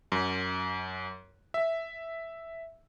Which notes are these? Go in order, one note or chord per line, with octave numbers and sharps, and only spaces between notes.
F#2
E5